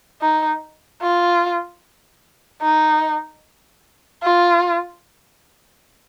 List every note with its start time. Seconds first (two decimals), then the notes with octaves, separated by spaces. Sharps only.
0.22 D#4
1.02 F4
2.62 D#4
4.23 F4